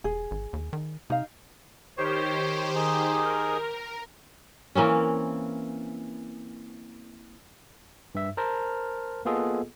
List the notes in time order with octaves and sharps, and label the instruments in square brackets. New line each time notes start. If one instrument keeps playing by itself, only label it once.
[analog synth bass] E1 [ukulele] G#4
[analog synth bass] G#1
D#2
D#3
[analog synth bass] C3 [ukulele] D#4 F5
[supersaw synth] D#3 G4 C5 [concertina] C#5
[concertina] D#4 G#4
[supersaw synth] A#4
[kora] E3 A#3 C4 C#4
[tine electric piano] G2 E5
A#4 C5 A5 A#5 F6
A#3 B3 F4 G#4 A4 D#5